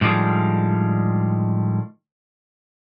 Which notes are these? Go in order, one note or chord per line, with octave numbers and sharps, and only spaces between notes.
A2 D3 D#3 F3 G3 G#3